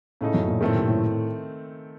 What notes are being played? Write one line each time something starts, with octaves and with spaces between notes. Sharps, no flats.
A2 C#3 A3 D#4
F#2
A#2
A2 D#3 A3 C4
C3
A2